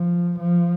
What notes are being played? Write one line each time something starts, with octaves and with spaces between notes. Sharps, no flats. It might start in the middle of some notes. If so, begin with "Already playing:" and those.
Already playing: F3
F3